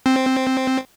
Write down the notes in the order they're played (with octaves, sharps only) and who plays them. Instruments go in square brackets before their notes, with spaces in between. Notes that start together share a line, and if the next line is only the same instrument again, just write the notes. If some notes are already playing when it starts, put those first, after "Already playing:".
[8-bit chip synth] C4